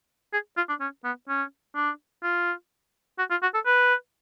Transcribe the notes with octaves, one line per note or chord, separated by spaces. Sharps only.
G#4
F4
D4
C#4
B3
C#4
D4
F4
F#4
F4
F#4
A4
B4